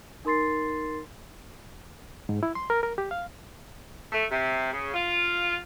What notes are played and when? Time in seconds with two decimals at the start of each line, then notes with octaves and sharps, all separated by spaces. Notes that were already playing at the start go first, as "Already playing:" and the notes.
0.25 D#4 A#4 C6 A6 C7
2.29 G#2
2.43 E4
2.55 C6
2.70 A#4
2.83 A#4
2.98 G4
3.11 F5
4.11 A3
4.31 C3
4.72 C#3
4.94 F4